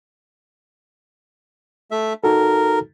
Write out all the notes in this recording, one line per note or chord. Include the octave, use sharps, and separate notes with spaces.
A3 E5
D#4 F#4 A4 A#4